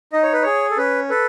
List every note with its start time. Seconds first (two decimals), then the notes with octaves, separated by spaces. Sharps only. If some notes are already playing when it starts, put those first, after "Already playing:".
0.13 D#4 D#5
0.23 C#5
0.33 B4
0.42 G#4 C#5
0.71 A4
0.77 C#4 B4
1.10 A4 B4